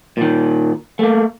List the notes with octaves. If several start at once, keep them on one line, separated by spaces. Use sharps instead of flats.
A#2 D#3
A3 A#3